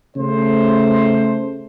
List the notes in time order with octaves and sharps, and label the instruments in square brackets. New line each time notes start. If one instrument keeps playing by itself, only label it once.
[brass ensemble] C#3 A3 C5